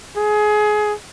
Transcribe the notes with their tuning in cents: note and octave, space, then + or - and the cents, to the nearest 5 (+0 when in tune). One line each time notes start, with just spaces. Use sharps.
G#4 +25